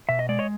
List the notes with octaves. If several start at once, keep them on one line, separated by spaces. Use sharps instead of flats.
B2 E5
D#5
G#3 D5
C#5 D#5